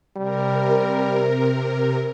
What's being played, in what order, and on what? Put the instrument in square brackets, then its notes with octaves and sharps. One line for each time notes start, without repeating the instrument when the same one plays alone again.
[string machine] C3 A#4 [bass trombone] G3